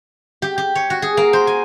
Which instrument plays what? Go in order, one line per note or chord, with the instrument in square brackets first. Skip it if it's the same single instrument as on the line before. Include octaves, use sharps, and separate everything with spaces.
[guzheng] G4
G4
C#5
F#4
G#4
A#3
C5
G#5